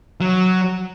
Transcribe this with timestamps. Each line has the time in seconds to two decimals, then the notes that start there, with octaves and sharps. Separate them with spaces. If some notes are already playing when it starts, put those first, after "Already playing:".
0.21 F#3